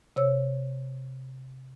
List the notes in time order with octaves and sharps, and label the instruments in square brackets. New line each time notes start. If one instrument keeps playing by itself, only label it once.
[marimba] C3 C#5 E6